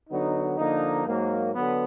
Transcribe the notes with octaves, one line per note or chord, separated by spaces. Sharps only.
D3 F#3 B3 D#4
D3 F3 A#3 D#4
G#2 F#3 A#3
D3 F#3 B3